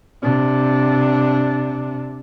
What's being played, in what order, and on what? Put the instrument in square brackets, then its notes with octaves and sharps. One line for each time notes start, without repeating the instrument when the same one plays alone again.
[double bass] C3 D4